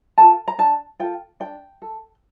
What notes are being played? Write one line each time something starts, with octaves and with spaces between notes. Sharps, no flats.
F4 A4 A5
A#5
D4 A5
F4 A4 G5
D4 G5
A4